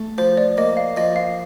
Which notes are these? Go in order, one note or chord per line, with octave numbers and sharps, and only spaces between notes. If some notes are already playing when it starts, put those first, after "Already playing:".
Already playing: A3
F3 C5
D5
A#3 D#5
F5
F3 D#5
F5